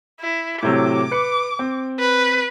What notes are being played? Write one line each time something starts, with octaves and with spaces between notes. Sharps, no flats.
E4
A2 C3 F#3 D6
B4 C#7
C4
B4